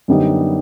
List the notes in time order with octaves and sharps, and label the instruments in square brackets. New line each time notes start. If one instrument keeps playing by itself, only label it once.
[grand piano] F#2 D3 G3 B3 D#4